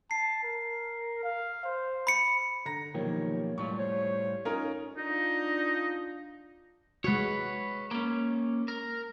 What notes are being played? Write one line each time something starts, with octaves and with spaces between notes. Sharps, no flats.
A5 C7
A#4
F5
C5
B5 C#7
D3 A#5 A#6
B1 D#3 F3 A#3 G4 C#5
A2 F#3 G3 F4 C#6
C5 C#5
C#4 D#4 F4 A#4
D4 D#4 F4
G#3 F#4 B4 C#5
A#3 C#4
A#4